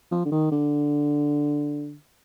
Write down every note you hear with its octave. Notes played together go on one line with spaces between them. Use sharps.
F3
D3
D#3
D3